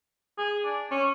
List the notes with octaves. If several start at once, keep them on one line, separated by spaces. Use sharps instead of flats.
G#4
D4
C#4